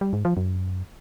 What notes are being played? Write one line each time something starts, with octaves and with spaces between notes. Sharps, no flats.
G3
G#2
F3
F#2